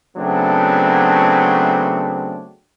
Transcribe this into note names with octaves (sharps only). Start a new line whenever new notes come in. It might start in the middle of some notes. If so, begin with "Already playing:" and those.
C#3 F#3 A3 B3 C4 D4